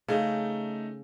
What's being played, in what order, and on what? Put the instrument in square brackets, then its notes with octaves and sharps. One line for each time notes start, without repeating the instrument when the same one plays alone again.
[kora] C#3 [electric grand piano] A3 D#4